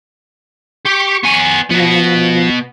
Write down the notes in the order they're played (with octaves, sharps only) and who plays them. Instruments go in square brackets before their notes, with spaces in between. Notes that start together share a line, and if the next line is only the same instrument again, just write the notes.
[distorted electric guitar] G4 [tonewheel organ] C#6
[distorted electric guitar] B3 G#5
[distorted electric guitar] B2 B3 [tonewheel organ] F3